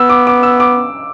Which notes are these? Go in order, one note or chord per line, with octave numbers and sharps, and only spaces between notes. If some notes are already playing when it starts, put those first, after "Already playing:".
Already playing: B3 E6
D6
D6
E6
D6